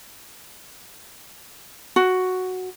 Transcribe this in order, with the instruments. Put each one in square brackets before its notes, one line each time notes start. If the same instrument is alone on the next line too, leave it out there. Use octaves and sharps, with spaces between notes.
[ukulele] F#4